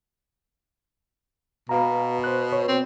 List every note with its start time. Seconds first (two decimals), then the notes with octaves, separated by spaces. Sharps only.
1.69 B2 B4 F5 A#5
2.24 C5 F#6
2.53 C#5
2.68 C4